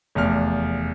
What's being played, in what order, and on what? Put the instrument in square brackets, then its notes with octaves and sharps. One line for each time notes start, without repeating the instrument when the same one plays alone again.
[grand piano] F1 E2 F6